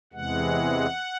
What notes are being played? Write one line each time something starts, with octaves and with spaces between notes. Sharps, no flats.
E2 C3 E3 G#3 F#5